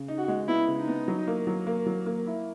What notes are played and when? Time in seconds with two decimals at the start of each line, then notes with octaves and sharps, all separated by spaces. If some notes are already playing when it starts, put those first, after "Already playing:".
Already playing: C#3
0.08 D#4
0.18 F#4
0.28 G#3
0.48 B3 E4
0.68 C#3
0.78 D#4
0.88 B3
1.08 F#3
1.28 A#3
1.47 F#3
1.67 A#3
1.86 F#3
2.06 A#3
2.27 E4